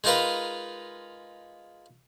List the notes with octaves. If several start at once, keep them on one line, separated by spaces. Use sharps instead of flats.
G#3 D#4 F4 A#4 B4